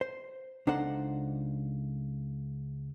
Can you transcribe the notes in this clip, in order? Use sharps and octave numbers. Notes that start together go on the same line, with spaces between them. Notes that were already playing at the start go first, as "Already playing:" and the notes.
C5
C#2 D4 D#4 A4 C5 F#5